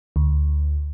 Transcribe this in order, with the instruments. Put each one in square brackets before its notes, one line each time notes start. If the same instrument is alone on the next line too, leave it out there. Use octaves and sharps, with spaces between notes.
[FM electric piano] D2